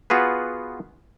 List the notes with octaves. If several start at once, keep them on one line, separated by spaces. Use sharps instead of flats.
B3 F4 F#4 G#4 B4